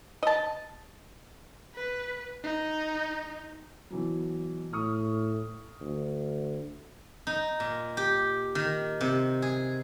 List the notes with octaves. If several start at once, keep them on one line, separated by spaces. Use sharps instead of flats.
D#5 A5
B4
D#4
B2 E3 F#3
A2 C#6 D#6 F6
D2
D#4
A#2
G4
D#3
C3
G#4